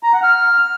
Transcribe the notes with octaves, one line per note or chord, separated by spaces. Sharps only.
A#5
F#5
F6